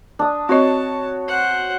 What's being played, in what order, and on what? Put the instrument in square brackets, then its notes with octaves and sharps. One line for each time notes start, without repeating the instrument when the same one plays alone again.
[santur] D4 D#6
[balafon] C4 D#5 [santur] F#4 C#5 [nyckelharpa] A5
[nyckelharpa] C5 F#5